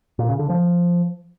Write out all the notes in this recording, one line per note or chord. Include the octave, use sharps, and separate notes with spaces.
A#2
C#3
D3
F3